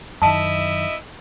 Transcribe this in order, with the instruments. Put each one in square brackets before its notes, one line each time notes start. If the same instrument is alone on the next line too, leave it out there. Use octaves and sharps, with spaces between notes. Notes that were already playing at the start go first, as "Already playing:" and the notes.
[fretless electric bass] F#2 D#3 [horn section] E4 D#5 E5 [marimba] A5